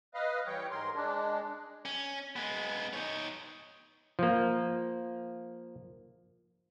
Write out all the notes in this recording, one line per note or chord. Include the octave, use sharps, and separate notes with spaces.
B4 D#5 F5
E3 G3 C#5 G5
G#2 A#4 C6
G#3 D4
C#4
G#3 B3
D#4 C#5
F3 A#3